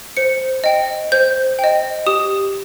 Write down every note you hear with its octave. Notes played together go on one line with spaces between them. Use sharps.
C5 C#7
D#5 G5
C5 G6
D#5 G5
G4 D#6